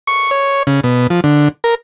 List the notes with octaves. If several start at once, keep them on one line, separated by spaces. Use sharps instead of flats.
C#6
C#5
C#3
B2
F3
D3
A#4